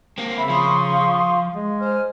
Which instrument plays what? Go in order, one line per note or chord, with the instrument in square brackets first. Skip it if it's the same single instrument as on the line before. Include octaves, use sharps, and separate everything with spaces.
[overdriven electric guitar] A#3 C4
[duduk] C#3 [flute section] E5 [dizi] B5
[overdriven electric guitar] F3 [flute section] C6 C#6 D#6
[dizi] F5
[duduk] G#3
[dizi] C5 [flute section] G#5 F6